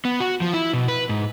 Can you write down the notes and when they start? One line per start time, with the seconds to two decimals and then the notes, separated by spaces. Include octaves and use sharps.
0.05 B3
0.20 F#4
0.41 F3
0.53 E4
0.74 B2
0.88 B4
1.09 G#2